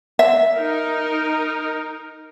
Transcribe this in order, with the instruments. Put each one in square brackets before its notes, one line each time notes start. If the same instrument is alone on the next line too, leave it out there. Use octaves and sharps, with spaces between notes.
[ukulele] E5
[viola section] D#4 A#4